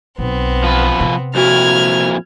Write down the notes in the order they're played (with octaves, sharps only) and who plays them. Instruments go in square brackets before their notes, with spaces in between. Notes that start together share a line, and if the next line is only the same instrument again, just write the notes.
[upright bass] B1 [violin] B3 C4
[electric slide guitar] F3 B4
[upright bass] C3
[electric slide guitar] F2 A#2 E4 [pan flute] F#4 [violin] F6 G#6